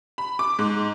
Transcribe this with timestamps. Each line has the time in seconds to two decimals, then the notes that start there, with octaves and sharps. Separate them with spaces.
0.18 B5
0.39 D6
0.59 G#2